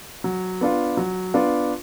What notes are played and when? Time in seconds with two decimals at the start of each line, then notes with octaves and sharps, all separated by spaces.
0.24 F#3
0.61 B3 D4 F4
0.97 F#3
1.34 B3 D4 F4